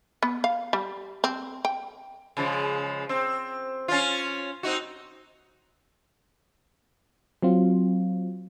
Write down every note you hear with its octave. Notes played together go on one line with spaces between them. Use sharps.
B3
F5
G3
C4
G5
C#3 F3 G#3
C4
C#4 F4
C4 D#4 F#4
F#3 C4 F4